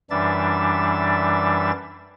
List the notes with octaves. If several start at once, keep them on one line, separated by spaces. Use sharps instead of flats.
F#2 E3 G3 D4 E5 A6